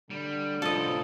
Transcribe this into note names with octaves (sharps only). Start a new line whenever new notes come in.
D3 G3
A2 C3 F3 A4 D#5